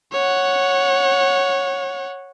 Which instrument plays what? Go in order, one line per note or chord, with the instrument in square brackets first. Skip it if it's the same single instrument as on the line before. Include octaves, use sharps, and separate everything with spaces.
[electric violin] C#5 F#5